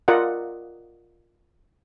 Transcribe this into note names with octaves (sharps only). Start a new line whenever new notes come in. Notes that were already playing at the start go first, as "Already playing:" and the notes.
F4 A#4 D5 D#5 F#5